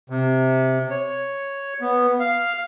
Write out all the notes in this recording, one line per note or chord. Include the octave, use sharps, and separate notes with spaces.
C3
C#5
B3
F5